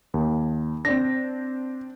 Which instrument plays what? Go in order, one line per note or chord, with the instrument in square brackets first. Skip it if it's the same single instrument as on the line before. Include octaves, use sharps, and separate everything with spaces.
[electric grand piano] D#2
[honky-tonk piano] C4 D4 [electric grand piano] A#6